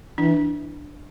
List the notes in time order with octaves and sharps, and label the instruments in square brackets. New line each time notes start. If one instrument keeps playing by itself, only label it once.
[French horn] E3 [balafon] D4